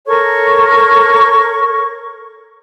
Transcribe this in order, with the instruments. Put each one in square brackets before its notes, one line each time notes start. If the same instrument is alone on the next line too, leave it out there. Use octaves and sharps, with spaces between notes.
[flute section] A4 A#4 C#5 C#6